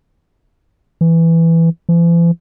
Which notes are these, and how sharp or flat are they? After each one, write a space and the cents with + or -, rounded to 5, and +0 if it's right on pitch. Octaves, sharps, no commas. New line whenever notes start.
E3 +5
E3 +45